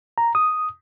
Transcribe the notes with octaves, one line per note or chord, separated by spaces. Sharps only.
A#5
D#6